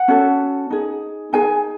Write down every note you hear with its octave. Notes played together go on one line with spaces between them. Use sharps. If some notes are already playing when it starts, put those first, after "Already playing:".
Already playing: F#5
C#4 F#4 A4
D#4 G#4
D#4 G#4 G#5